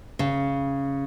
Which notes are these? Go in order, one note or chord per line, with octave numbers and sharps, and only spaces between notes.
C#3